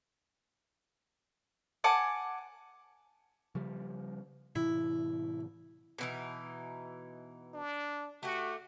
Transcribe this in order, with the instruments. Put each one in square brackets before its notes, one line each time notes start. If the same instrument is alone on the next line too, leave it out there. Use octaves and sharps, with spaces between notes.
[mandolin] F#5 G#5 A5 D6
[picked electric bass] C#3 F3 G3
[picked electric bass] A2 C3 E3 [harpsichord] E4
[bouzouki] B2 E3 D#4
[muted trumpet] D4
[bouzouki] A3 G4 [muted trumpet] F#4